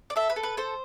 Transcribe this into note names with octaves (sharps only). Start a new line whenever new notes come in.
D5
A4 E5
B4
A4
B4
A4 C5